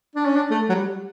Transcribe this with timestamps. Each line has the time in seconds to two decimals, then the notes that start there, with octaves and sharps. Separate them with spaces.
0.15 D4
0.26 C#4
0.36 D4
0.50 A3
0.69 F#3
0.75 G3